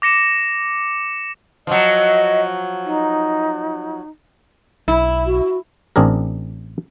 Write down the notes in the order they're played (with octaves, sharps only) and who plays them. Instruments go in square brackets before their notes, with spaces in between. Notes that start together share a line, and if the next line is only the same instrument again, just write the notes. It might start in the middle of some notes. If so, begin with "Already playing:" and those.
[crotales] D6 A#6 C#7 E7
[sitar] F3 F#3 [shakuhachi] D#5
[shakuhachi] D#4
[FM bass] B1 [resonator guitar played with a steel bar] E4
[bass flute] F#4
[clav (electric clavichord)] A1 C4 D4 G#4 A#4